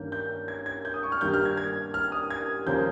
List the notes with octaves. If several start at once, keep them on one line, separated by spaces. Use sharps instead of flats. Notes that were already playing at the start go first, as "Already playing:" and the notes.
Already playing: G2 D#3 A#3 C#4 G6
G6
G#6
G#6
G6
D#6
C#6
F6
G2 D#3 G3 A#3 G6
F6
G#6
G#6
F6
D#6
G#6
D#2 C#3 F3 A#3 C#4 G6